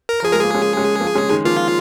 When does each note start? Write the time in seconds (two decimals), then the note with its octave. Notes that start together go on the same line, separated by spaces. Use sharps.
0.09 A#4
0.22 F3 G#4
0.33 G#3 A#4
0.39 A#3 G#4
0.54 G#3 C#4
0.77 G#3 C#4
1.00 F3 A#3
1.15 G#3 C#4
1.30 D#3 G#3
1.45 F3 A#3 F4